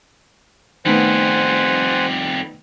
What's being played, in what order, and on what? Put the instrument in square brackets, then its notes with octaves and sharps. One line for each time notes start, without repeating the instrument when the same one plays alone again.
[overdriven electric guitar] F2 G3 [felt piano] D#3 A3 B3 [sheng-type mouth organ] C5 F#5 G#5